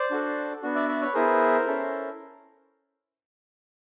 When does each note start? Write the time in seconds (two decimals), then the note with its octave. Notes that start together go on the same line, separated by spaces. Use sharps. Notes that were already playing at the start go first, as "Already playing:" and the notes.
Already playing: C5 D5
0.11 D4 F#4 A4
0.62 B3 D4 F#4
0.75 D5 E5
0.89 D5 E5
1.02 B4 C#5
1.14 B3 E4 G#4 A#4 C5
1.67 C#4 E4 A4